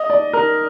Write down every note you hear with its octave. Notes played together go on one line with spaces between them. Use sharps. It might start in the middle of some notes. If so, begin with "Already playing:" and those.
Already playing: D#5
D5
A#4